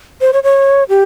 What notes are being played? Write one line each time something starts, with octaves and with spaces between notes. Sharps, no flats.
C5
C#5
C#5
G4